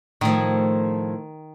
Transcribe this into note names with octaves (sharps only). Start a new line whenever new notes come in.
A2 D#3 F3